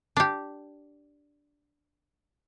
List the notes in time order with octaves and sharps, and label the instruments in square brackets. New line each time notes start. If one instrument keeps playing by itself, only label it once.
[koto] D4 G4